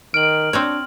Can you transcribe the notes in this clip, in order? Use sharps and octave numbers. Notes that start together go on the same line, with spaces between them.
D#3 F6 D7 F#7
C4 D4 F#4 C#5